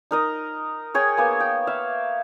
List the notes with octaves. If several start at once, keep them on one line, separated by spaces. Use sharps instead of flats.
D#4 A#4 D#5
G#4 C#5 G5
A#3 B3 G#5
G5
E5 F5